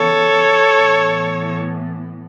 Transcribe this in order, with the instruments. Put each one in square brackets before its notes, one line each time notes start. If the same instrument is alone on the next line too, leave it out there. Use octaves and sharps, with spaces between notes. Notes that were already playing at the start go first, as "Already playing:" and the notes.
Already playing: [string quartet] C#3 E3 B3 A4 C#5
A2 E3 B3